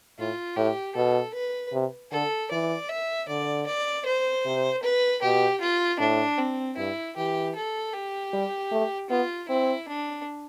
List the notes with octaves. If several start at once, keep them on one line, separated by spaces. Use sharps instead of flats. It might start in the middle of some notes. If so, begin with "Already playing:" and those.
A2 F4
A2 G4
B2 A4
B4
C3
D3 A4
E3 D5
E5
D3 D5
D5
C5
C3
B4
B2 G4
F4
A2 D4
C4
G2 E4
E3 G4
A4
G4
G3
A3
B3 F4
C4 E4
D4